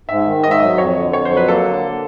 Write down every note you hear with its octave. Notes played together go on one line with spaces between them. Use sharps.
G#2 E5
D#3
G#2 D#5
E5
F#3 D#5
F2 C#5
D3
F2 C#5
C5
F#3
B4
A#3 A4
D3